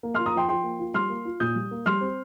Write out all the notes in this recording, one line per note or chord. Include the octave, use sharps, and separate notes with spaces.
A#3
F4 C6 F6
A#5 D#6
F3 G5 C6
F3 G5 C6
A#3
F4
G3 C6 F6
A#3
F4
A#2 D#6 G6
G3
A#3
G3 C6 F6
C4